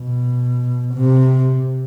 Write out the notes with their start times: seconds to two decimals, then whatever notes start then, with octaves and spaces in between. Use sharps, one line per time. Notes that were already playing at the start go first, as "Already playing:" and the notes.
Already playing: B2
0.94 C3